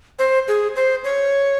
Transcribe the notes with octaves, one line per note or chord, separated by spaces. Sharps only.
C5
G#4
C5
C#5